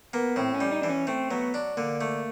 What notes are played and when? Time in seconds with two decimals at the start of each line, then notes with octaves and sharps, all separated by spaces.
0.13 A#3 B3
0.36 A2 C4
0.54 C#4
0.61 G3
0.71 D#4
0.82 E3 D4
0.89 C#4
1.07 A3 C4
1.30 F#3 B3
1.54 D4
1.77 D3 A#3
2.01 A3